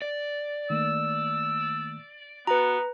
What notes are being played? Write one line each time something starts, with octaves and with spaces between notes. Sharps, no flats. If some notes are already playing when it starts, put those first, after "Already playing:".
D5
D#3 A3 A#3 E6
B3 F#4 B4 A#5